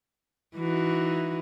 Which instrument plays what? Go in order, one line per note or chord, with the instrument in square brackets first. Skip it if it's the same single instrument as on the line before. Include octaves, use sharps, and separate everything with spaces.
[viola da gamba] E3 D#4 F#4